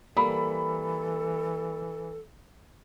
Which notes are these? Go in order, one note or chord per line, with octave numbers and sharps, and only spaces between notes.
E3 G3 A#3 A4 B5